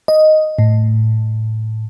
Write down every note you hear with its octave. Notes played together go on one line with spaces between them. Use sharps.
D#5
A2